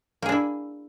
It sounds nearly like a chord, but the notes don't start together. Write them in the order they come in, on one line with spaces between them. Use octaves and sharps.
A#3 G#4 D4 E4